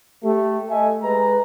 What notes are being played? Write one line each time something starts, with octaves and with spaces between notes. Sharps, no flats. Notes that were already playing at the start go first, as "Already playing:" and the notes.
A3 G4
A4 D#5 E5 G#5
G#3 B4 A#5